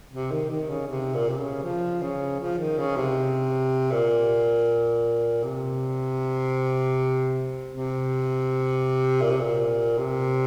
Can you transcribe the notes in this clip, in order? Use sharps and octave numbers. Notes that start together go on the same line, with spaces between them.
C3
D#3
D#3
C#3
C3
A#2
C3
C#3
F3
C#3
F3
D#3
C#3
C3
A#2
C3
C3
A#2
C3
A#2
C3